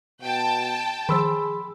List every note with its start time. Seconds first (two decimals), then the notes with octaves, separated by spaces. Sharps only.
0.22 B2 G5 A5
1.09 D#3 F3 G#4 B5 C6 E6